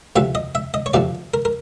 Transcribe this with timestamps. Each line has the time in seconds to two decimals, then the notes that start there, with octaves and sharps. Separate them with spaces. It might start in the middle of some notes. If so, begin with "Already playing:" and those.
0.16 D2 C3 F3 E5
0.35 D#5
0.55 E5
0.74 D#5
0.86 C#5
0.94 D2 C3 F3 D5
1.34 A#4
1.45 A#4